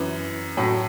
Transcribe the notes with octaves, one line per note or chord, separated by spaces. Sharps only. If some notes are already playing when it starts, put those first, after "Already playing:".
Already playing: F#2 E3
A2 F#3